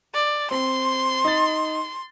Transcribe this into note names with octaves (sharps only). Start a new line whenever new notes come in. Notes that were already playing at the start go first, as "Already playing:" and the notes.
D5
C4 C6
D#4 A6